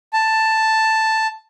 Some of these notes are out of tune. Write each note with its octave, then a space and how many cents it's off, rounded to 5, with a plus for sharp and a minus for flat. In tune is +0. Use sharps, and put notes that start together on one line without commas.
A5 +5